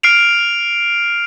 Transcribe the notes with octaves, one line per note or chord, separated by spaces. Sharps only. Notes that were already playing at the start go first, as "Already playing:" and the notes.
F6 C7 D7 F7